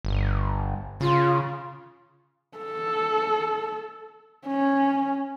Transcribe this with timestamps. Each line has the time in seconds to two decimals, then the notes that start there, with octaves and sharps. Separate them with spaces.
0.05 G1
1.01 C#3 F4
2.58 A4
4.47 C#4